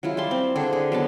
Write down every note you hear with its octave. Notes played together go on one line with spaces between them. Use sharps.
F#3 G#3 E4 F4
G3 A5 C6
C4
D3 C4 D4 G#4
G#4
F#3 B3 A5